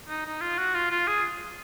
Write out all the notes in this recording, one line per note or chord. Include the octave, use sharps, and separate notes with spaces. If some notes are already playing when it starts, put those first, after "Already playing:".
D#4
D#4
F4
F#4
F4
F4
G#4